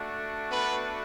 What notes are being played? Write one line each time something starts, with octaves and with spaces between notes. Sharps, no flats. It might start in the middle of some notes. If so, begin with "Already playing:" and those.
Already playing: A3 D4 F#4
B3 B4